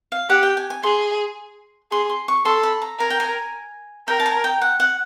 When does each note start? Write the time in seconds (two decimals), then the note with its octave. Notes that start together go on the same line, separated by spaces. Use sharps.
0.12 F5
0.30 G4 F#5
0.43 G5
0.57 G#5
0.70 G#5
0.83 G#4 C6
1.91 G#4 C6
2.10 C6
2.28 C#6
2.45 A4 C6
2.63 B5
2.82 A#5
2.99 A#4 G#5
3.10 G5
3.20 G#5
4.08 A#4 G5
4.20 A5
4.26 G#5
4.44 G5
4.62 F#5
4.80 F#5